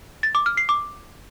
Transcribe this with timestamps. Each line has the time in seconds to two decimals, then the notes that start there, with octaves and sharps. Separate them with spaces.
0.23 A6
0.35 D6
0.46 F6
0.57 C7
0.69 D6